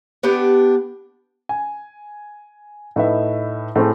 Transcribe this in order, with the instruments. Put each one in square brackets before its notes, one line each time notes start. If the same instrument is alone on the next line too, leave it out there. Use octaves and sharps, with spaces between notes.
[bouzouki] B3 D4 G4 F#5
[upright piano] G#5
A2 D#4 B4 E5
A2 A3 C4 G#4 A4